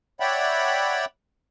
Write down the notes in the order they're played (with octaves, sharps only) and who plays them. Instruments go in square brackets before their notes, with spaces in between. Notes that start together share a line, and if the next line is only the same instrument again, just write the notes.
[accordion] C#5 D5 E5 F#5 G5 B5